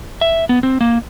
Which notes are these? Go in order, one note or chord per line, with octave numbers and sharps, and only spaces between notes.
E5
B3
C4
A#3